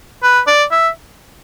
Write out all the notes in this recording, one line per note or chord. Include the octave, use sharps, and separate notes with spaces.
B4
D5
E5